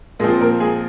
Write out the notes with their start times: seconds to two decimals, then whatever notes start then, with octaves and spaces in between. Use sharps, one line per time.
0.19 A#2 F3 G#3 C4 G#4
0.41 A#3 A#4
0.60 G#3 G#4